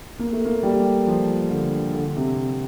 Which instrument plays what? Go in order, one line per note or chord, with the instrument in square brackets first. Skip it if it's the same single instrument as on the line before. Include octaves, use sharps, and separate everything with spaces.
[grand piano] A#3
A3
A#3
G3
F3
D3
D3
C3